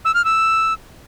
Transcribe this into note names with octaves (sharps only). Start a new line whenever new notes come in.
E6
F6
E6